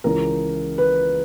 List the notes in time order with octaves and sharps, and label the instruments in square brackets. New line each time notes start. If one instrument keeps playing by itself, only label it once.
[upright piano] C#2 C#3 E3 A#4
B4